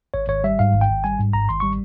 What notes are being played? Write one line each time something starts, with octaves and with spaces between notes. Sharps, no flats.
G#1 C#5
G#1 C#5
G3 E5
G#2 F5
G#1
G5
G#1
G3 G#5
G#2
G#1 A#5
G#1 C6
G3 C#6